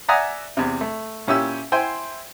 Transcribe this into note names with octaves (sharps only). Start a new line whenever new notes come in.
D5 E5 F#5 G#5 A#5 D#6
E2 C3
A3
A#2 C#4 E4 G4 E6
E4 C5 G5 G#5 C6